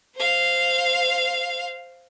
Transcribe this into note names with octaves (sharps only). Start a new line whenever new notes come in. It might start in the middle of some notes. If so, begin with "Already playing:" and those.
C5 F5